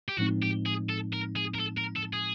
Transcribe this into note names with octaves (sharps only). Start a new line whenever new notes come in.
G4
A2 F3 G#3 C4 D#4 F#4
G4
G#4
A4
A#4
G#4
A#4
A4
A#4
A4
G#4